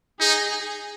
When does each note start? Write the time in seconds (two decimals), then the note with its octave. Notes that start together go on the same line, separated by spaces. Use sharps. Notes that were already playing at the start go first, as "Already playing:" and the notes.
0.20 D#4 G#4